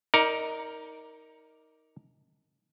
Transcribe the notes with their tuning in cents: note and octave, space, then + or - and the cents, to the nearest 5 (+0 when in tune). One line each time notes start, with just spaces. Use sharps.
D#4 +20 A#4 +0 D5 +0